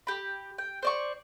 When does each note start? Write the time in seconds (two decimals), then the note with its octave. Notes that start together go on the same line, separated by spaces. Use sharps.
0.07 G4 B5
0.58 G5
0.83 C5 D5 C#6